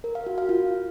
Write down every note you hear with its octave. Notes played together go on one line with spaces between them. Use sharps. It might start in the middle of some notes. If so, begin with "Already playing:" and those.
A#4
F5
F#4
F5
F4